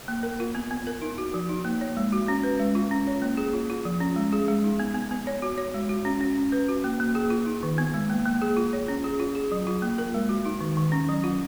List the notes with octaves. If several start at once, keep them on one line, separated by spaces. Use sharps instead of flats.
A#3
A#4
F4
B3
B3
A#4
D#4
F#4
F3
D#4
A#3
C#5
G#3
F#4
C#4
B4
G#3
F4
C#4
C#5
A#3
G#4
F4
F4
F3
C#4
G#3
G#4
G#3
D#4
B3
B3
B3
C#5
F#4
C#5
G#3
F#4
C#4
C#4
C#4
B4
F#4
A#3
A#3
G#4
F4
D#4
D#3
B3
G#3
A#3
A#3
G#4
F4
C#5
C#4
G#4
F4
G#4
F#3
F4
A#3
A#4
G#3
F#4
D#4
D#3
D#3
C#4
F#3
F4